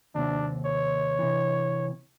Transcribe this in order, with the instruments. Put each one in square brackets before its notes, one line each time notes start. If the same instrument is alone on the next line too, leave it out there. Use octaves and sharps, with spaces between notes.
[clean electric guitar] D#2 C3 C4 [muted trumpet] D4
[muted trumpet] C#5
[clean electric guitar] C3 E3